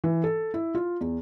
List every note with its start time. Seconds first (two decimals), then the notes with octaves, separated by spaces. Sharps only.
0.04 E3
0.24 A4
0.54 E4
0.75 F4
1.01 E2